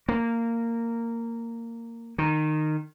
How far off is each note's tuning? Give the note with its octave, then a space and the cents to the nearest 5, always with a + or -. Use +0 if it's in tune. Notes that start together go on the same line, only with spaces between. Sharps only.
A#3 -15
D#3 -15